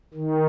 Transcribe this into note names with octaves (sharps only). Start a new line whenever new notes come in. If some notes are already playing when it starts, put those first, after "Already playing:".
D#3